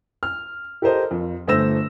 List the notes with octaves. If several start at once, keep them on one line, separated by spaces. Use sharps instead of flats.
F6
G4 A4 A#4 C5 D#5
F2
G1 A3 C5 E6 A#6 E7